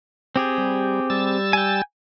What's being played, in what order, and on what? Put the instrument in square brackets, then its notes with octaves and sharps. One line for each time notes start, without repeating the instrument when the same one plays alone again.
[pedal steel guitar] C4 G4 G#4
[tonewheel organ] G3
G3 E6 A6
[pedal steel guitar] G5 G#5